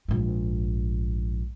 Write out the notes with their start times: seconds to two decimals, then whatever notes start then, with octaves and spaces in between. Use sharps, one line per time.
0.08 A#1 G#2